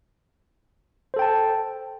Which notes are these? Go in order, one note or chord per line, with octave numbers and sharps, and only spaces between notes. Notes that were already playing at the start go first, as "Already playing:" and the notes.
A4 C5 G5 A5